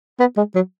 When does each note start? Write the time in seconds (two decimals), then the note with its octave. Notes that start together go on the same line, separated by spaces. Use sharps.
0.20 B3
0.37 G#3
0.55 F#3